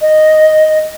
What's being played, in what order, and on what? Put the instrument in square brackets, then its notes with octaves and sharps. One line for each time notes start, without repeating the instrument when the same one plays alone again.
[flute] D#5